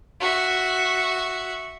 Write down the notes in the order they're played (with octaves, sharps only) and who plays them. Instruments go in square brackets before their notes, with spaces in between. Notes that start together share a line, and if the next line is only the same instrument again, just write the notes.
[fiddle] F#4 E5